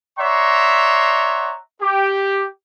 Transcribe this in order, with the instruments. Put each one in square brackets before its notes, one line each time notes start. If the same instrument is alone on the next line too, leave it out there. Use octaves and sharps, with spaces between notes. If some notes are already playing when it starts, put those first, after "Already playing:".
[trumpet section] C#5 D5 E5 F#5 A#5 C6
G4